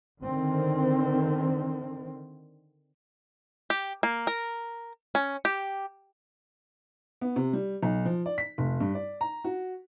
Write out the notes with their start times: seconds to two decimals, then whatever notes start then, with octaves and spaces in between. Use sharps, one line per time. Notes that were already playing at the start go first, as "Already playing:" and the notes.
0.23 D3 D#3 C4
3.70 G4
4.03 A#3
4.27 A#4
5.15 C#4
5.45 G4
7.21 B3
7.36 C3
7.53 G3
7.82 B1
8.05 F3
8.26 D5
8.38 B6
8.58 F1
8.80 G2
8.95 D5
9.21 A#5
9.44 F#4